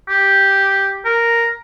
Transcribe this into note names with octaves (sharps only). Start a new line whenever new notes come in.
G4
A#4